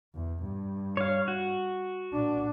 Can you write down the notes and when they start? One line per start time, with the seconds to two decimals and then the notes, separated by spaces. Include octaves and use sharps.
0.14 E2
0.43 G2
0.97 C#5 F5
1.28 F#4
2.13 A#2 D4